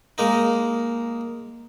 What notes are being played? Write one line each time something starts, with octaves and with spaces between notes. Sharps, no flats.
G#3 A#3 D#4